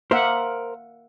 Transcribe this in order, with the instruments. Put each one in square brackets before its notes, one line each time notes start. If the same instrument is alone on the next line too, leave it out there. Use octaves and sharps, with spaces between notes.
[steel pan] A#3 E5 F#5 [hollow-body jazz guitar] A#4 C5